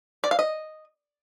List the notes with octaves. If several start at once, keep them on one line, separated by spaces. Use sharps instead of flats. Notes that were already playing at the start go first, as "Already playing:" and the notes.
D5
F5
D#5